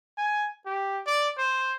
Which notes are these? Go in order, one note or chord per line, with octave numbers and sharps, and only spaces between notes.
G#5
G4
D5
C5